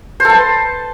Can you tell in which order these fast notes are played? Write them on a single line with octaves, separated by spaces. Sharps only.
C5 A4 A5 B4